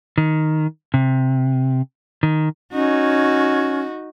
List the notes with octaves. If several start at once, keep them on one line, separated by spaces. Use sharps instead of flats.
D#3
C3
D#3
C#4 D#4 F#4